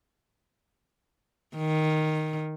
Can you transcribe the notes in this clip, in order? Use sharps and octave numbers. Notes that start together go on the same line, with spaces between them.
D#3